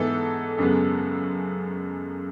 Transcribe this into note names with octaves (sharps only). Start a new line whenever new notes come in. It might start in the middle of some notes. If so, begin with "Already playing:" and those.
Already playing: G#2 E3 B3 A4
F#2 C#3 G#3 B3